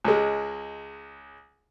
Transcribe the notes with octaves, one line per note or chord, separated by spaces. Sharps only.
C#2 G#3